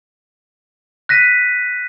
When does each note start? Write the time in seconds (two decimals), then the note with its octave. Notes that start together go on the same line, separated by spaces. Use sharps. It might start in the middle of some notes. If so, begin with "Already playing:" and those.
1.09 F#6 A#6 B6 D#7